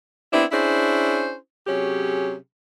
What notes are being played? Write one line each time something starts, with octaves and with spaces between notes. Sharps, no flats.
B3 C4 D4 E4
C#4 D4 E4 G#4 C5
C3 F#3 C#4 G4 G#4